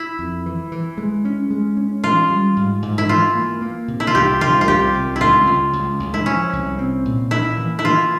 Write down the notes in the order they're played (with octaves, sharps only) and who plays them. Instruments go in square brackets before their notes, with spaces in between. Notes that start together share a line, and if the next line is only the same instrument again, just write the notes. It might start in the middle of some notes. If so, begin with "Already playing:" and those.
Already playing: [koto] E4
[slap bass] F2
E3
E3
G#3
C#4
G#3
C#4
[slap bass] E3 [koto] F4
[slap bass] G3
G#2
G#2
[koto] E4
[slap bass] E3 [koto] F4
[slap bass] A#3
A#3
C3
[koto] E4
F4
[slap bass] C2 [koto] G4
[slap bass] C2 [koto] F4
[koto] F4
[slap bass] C2 [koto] G4
[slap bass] C2
[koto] E4
[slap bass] C#2 [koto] F4
[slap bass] C#2
C#2
C#2
[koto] E4
[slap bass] F3 [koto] C#4
[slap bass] C2
C4
A#2
[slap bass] A#3 [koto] E4
[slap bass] E3
[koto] E4
[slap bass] E3 [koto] F4